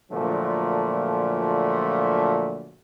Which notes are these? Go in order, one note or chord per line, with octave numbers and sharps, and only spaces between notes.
A#2 D3 F3 F#3 A3